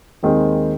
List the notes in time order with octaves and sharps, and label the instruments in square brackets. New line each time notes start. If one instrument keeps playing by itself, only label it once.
[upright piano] D#2 D#3 G#3 C4